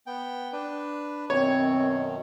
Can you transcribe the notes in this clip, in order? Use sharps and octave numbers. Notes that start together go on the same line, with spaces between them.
B3 G5
D4 B4
F#2 B2 D#3 C4 C#5